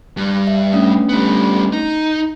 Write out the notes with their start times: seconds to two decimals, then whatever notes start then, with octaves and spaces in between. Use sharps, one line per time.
0.17 G2
0.47 E5
0.73 A3 C#4 D4
1.09 G3 B3
1.73 D#4